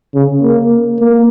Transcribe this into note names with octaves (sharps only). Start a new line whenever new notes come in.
C#3
A#3
A#3